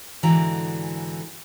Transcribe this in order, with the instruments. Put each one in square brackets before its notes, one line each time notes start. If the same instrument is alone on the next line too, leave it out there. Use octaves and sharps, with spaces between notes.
[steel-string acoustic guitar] G#2 D3 E3 F#4 D5 A#5